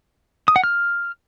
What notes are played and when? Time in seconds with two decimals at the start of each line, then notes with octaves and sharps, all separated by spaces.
0.48 D#6
0.56 F#5
0.64 F6